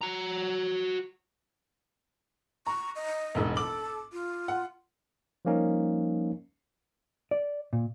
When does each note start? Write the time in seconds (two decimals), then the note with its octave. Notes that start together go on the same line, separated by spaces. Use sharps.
0.01 F#4 A#5
2.67 A#5 C#6
2.96 D#5
3.35 E1 A1 G#2
3.57 A4 D6 F#7
4.12 F4
4.48 F#5
5.45 F3 G3 A#3 C#4 D#4
7.31 D5
7.73 A#2